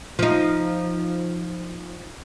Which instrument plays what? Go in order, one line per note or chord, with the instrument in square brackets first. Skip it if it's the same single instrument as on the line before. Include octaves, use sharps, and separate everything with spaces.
[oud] F3 D#4